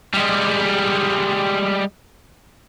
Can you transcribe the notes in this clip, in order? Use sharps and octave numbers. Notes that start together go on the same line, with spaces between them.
G3 G#3